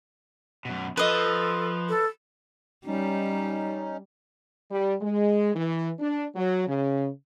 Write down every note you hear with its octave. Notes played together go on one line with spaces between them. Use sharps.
F#2 B2
F3 A4 B4 D#5
A4
G3 C#4 D#4
G3
G#3
E3
D4
F#3
C#3